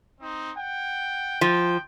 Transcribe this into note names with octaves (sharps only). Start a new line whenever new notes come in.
C4 D#4
F#5 G5
F3 G5